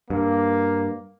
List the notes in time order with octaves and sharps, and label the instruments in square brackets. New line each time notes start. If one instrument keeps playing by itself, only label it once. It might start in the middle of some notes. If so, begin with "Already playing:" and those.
[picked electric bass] G2 [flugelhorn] A#3